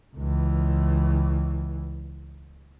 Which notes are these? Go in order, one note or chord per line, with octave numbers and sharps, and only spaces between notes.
C#2 E3